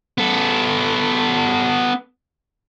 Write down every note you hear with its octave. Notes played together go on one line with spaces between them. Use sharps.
B3 A4